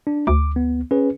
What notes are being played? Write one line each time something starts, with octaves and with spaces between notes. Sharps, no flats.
D4
D2 D6
B3
C#4 G#4 B4